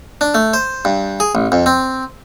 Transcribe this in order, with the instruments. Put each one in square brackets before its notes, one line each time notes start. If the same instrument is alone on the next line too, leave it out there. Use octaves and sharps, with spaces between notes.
[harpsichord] D4
A3
C5
G2
G#4
A1
F2
C4